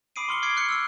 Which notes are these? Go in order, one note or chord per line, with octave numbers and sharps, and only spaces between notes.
B5 D6 D#6 C7 D7 D#7
C6 C#6 F6 C#7 F#7 G7
D6 D#6 F6 G#6 C7 D7
F6 F#6 C7 C#7
E6 F6 C#7